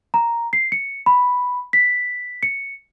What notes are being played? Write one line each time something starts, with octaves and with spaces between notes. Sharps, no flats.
A#5
C7
C#7
B5
B6
C#7